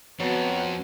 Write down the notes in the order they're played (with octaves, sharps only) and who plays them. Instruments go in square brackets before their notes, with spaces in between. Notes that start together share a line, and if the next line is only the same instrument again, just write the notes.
[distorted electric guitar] F2 [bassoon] F#3 [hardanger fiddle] B3 F#4